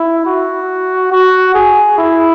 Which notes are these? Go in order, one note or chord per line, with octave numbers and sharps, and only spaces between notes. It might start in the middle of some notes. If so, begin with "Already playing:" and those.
Already playing: E4
F#4
F#4
G#4
E4